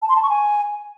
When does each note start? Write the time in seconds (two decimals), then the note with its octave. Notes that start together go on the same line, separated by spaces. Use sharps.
0.02 A5
0.09 C6
0.16 A5
0.23 C#6
0.30 G#5